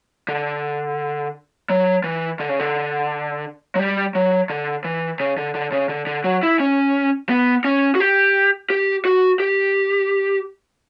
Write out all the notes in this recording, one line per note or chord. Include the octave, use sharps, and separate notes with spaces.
D3
F#3
E3
D3
C#3
D3
F#3
G3
F#3
D3
E3
C#3
D3
D3
C#3
D3
D3
F#3
E4
C#4
B3
C#4
F#4
G4
G4
F#4
G4